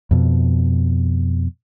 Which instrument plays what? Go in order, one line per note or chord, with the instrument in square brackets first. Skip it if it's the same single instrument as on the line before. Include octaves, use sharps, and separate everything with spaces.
[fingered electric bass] F2 B2